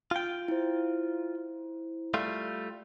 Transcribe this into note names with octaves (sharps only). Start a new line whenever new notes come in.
F4 G5
E4 C5
G3 A3 F4